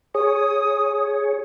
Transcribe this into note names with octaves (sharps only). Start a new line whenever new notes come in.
G#4 C#5 D#6